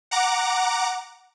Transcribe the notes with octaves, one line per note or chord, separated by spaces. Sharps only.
F#5 A#5 D6